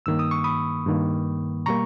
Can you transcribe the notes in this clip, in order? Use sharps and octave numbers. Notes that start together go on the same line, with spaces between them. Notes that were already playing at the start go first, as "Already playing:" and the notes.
G2 D#3 A#3 E6
D#6
C#6
B5 D#6
G2 D#3 A#3
B2 G3 A#3 A#5 C#6